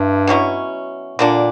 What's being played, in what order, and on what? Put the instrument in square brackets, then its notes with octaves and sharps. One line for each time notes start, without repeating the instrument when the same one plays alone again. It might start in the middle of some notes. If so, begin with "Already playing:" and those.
Already playing: [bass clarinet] G2 [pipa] E4
[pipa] B2 F#3 C#4 E4
[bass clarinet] A#2 [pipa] D3 A#3 D4